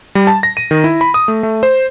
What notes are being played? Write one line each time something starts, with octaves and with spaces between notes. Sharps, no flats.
G3
A5
A#6
D#7
D#3
E4
B5
D#6
A3
A3
C5